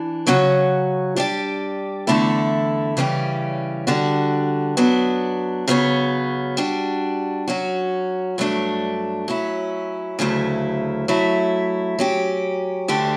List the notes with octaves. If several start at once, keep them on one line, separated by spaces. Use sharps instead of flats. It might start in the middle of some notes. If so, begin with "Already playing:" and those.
Already playing: E3 D4
C#3 F#3 C#4 F#4 C#5
G3 D4 G4 D5
E2 D3 A3 E4 A4
C#3 E3 G3 C#4 G4
D3 G3 D4 F#4
F#3 B3 D4
C#3 F#3 B3 F#4 C#5
G3 D4 F#4
F#3 C#4 F#4
G2 F#3 A3 D4
F#3 C#4 E4
D2 C#3 F#3 A3 E4
F#3 A3 E4
F#3 C#4 G4
D2 D3 A3 D4 G4